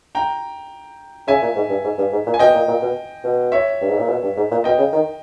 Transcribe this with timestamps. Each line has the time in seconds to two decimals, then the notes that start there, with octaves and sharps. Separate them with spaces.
0.15 G5 A#5
1.28 C#3 E5 G#5
1.42 A#2
1.55 G#2
1.70 G2
1.84 G#2
1.98 G2
2.12 G#2
2.27 A#2
2.34 G#5
2.39 B2 D#5 G5
2.54 A#2
2.68 A#2
2.82 B2
3.24 B2
3.52 C#5 E5
3.81 G2
3.90 G#2
3.99 A#2
4.09 B2
4.23 G2
4.37 G#2
4.51 A#2
4.64 B2 D#5 G5
4.78 C#3
4.93 D#3